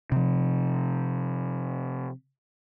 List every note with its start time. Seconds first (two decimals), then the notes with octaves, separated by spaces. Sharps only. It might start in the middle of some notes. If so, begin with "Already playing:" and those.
0.12 C3 F3